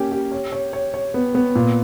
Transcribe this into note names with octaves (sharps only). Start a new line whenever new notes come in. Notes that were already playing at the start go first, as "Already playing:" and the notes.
Already playing: A#3 C#4 G4
G4
C#5
C#5
C#5
C#5
B3
B3
A#2